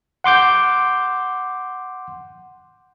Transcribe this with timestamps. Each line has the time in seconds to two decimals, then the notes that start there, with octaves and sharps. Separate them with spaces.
0.24 F#5 C6 D6 G6